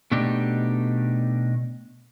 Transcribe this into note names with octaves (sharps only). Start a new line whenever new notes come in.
B2 A3 D4 D#4 G4